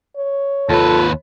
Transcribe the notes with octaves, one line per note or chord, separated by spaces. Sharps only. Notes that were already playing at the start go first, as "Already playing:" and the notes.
C#5
D#2 F4 A4 B4